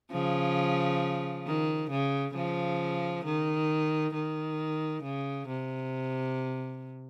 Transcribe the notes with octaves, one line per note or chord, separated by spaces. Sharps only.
C#3 F3
D#3
C#3
C#3 F3
D#3
D#3
C#3
C3